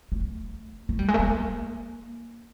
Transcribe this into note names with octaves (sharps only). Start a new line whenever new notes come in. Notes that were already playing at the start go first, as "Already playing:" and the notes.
A3
A3
G3
G#3
A3
A#3